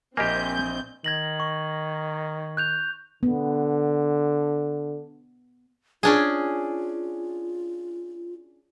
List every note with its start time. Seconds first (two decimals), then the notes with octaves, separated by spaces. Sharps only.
0.17 A#1 A#3 C4 G4 D#5 G#5 G6
1.04 D#3 G#6 A#6 F#7
1.40 C#6
2.57 F#6 G6 F7
3.23 D3 B3
6.03 C#4 D4 F4 G#4